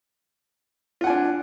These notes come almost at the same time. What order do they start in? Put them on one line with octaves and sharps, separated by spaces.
F4 F#5 G#5 D4